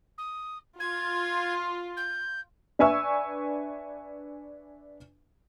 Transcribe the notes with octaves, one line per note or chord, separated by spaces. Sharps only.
D#6
F4 G#6
G6
D4 B4 E5 G#5 C#6 E6